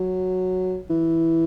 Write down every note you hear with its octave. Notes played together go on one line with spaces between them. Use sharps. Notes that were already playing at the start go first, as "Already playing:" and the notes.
Already playing: F#3
E3